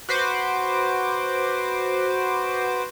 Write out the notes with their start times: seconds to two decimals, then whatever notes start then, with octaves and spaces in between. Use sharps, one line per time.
0.09 F#4 B4 C5 D6